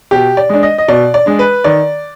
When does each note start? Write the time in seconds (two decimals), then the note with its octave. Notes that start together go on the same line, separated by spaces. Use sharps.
0.11 B2 G4
0.37 D5
0.49 G#3 D4
0.63 D#5
0.78 D#5
0.88 B2 D5
1.14 D5
1.26 G#3 D4
1.39 B4
1.64 D#3 D5